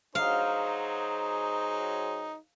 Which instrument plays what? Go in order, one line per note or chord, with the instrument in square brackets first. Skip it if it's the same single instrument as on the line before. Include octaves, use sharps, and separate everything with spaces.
[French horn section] F#3 G#4 C5 [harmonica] D#4 [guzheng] F5